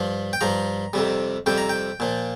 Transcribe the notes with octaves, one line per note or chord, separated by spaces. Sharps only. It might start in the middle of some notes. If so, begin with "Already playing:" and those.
Already playing: G2 F3
G5
G2 F3 A#5
F2 C3 G3
F2 C3 G3 G5
A#5
G5
A#2 F3